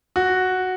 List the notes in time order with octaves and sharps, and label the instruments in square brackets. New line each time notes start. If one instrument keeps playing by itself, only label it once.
[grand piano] F#4